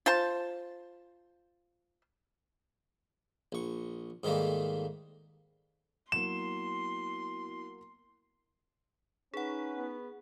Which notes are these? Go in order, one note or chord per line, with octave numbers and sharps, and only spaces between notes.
F4 C5 A5
A#1 C#6
G#2 D#3 G3 A3 A#3
F#3 A#3 B3 E4 F#4 C6 E7
C#4 D#4 G#4 B4 F#5
B3